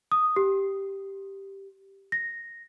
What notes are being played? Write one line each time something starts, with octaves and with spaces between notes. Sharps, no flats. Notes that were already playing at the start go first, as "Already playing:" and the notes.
D#6
G4
A#6